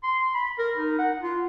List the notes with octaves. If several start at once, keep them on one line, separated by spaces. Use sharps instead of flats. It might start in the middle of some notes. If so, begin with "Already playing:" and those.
C6
B5
A#4
D#4
F#5
F4